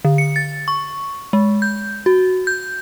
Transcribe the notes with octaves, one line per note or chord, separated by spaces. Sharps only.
D3
C#7
A6
C#6
G#3
G6
F#4
G6